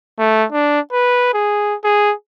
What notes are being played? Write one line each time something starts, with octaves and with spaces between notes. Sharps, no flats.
A3
D4
B4
G#4
G#4